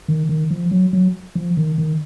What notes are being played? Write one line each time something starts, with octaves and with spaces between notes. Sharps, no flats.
D#3
D#3
F3
F#3
F#3
F3
D#3
D#3